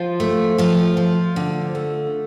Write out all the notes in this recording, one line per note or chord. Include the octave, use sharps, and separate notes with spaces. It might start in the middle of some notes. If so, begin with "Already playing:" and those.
Already playing: F3 F4
A3
F3 F4
F3
D3
A3